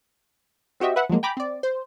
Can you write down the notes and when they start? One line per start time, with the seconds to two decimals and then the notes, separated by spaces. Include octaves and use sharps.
0.80 C4 F#4 G4 D#5 E5
0.96 B4 E5 F#5
1.09 F3 F#3 G#3 A#3
1.23 G5 G#5 A#5 B5 D6
1.37 C4 D5
1.63 C5